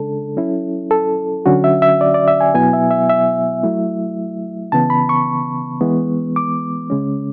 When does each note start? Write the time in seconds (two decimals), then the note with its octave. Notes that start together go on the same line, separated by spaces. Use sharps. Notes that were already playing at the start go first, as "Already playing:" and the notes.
Already playing: C#3 G#3 D4 A4
0.37 F#3 C#4 E4
0.91 A4
1.46 D3 F#3 C#4 F#4
1.64 E5
1.82 E5
2.01 D5
2.14 D5
2.28 E5
2.41 G#5
2.54 B2 F#3 B3 E4 G#5
2.73 E5
2.91 E5
3.10 E5
3.63 F#3 A3 E4
4.72 C#3 E3 B3 A5
4.90 B5
5.09 C#6
5.81 E3 G#3 B3
6.36 D6
6.90 C#3 G#3 C#4